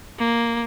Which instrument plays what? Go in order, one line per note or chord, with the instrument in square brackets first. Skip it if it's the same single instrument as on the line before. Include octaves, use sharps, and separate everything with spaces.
[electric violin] A#3